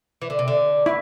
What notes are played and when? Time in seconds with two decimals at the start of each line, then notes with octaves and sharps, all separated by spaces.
0.22 E3
0.30 D3
0.39 C3
0.48 D3
0.86 E4